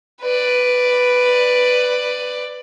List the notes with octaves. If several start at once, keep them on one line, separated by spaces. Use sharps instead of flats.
B4 D5